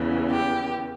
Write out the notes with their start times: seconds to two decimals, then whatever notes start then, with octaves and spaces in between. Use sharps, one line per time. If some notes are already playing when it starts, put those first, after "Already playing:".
Already playing: E2 C#3 E3
0.30 G4